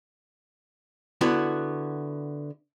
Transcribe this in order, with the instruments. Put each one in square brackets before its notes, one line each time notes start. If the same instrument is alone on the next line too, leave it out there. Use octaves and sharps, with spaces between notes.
[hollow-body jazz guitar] D3 B3 E4 F#4